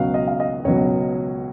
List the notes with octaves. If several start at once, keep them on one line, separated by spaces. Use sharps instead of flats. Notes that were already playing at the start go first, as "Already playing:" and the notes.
Already playing: C#2 B2 F#3 F5
D#5
F5
D#5
C#2 B2 F#3 C#5